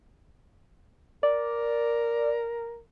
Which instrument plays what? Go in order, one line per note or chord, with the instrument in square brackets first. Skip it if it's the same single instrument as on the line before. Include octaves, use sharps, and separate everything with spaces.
[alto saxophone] A#4 [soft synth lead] D5